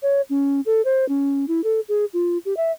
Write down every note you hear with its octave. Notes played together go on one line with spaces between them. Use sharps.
C#5
C#4
A4
C5
C#4
E4
A4
G#4
F4
G4
E5